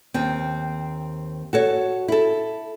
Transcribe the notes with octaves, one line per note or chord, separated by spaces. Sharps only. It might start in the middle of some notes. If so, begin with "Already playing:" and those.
D#2 C4
F#4 A4 C#5
E4 A4